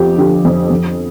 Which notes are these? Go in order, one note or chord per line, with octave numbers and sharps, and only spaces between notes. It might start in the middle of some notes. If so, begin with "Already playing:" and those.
Already playing: F2 F3 G4
D3 G4
F2
F2